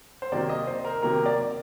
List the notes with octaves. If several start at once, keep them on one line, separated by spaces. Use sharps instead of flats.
C5
C3 D#3 F#3 A#3 D5
D#5
C5
A#4
C3 D#3 F#3 A#3 A#4
D5